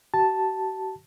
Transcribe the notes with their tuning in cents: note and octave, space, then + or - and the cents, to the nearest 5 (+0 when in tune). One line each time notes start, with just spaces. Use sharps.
F#4 +45 A5 +0